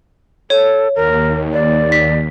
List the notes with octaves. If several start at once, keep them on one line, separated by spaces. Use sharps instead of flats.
A4 C#5
D#2 A#4
D5
B6